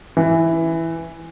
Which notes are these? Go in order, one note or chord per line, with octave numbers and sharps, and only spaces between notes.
E3